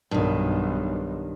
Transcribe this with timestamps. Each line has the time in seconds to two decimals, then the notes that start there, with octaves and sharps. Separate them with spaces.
0.11 B1 G2 D#3